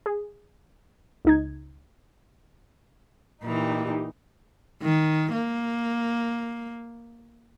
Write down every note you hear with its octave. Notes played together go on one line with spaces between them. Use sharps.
G#4
C#2 D#4 G#6
A#2 E3 D#4 G4
D#3
A#3